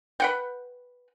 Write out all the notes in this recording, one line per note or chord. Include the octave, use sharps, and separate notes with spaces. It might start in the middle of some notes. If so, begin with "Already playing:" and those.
B4 F#5 G5